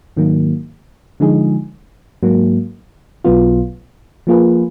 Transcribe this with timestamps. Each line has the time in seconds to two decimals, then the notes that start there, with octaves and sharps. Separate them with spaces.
0.17 G#2 D#3 F#3 A#3
1.20 D3 F3 G#3 D#4 G#4
2.23 G#2 F#3 A#3
3.25 B1 B2 F#3 B3 F4
4.27 F3 A#3 F4 G#4 B4